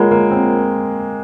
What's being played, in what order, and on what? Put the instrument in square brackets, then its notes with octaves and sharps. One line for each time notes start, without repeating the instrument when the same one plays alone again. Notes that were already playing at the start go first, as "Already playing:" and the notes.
Already playing: [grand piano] G#3 A#3 [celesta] F4 A#4 C#5 F#5 B5
[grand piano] A#3
C4